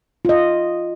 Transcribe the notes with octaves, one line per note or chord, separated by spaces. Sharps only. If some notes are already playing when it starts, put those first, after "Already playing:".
F4 D#5